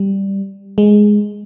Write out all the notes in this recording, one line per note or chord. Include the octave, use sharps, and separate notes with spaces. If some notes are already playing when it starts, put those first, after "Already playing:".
Already playing: G3
G#3